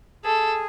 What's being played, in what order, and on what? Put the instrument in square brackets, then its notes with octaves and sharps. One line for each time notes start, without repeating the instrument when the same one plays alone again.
[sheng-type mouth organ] G#4 [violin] A4